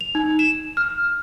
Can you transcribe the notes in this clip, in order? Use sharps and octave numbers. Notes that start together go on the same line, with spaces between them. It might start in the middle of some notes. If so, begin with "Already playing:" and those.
F7
D#4
E7
F6